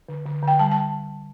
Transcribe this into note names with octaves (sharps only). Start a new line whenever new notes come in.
D3
D3
D3 G5
G3 A5
A5